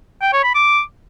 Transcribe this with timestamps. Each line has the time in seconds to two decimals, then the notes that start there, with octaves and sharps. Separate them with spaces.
0.22 G5
0.33 C#5
0.44 B5
0.55 D6